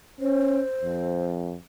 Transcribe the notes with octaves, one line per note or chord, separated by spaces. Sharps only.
C#4 C5
F2